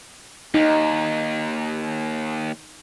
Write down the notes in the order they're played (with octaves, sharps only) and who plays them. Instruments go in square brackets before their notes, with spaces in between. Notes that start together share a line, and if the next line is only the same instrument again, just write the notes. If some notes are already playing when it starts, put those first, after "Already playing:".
[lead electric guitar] D#2 [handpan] D#4